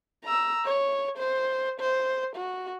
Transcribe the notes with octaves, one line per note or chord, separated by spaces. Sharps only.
A#5 E6
C#5
C5
C5
F#4